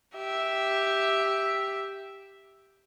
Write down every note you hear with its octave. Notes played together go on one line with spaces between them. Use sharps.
G4 E5